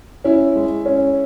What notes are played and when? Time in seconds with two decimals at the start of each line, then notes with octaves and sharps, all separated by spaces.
0.24 C#4 E4
0.56 G#3
0.86 C#4